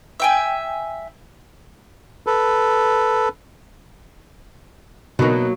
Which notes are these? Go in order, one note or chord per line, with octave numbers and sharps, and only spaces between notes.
E5 G5 G#5
A4 B4
B2 F#3 A#3 B3 D#4